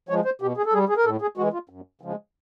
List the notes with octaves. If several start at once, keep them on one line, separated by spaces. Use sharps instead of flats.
F3 G#3 C#5
C5
B2 G4
G#4
A4
G3 G#4
G#4
A#4
A2 A4
G#4
E3 G#3 F#4
F4
F#2
C#3 F3 G#3